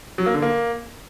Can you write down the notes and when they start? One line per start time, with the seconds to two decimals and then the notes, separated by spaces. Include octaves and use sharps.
0.18 F#3
0.26 A#3
0.34 D3
0.42 A#3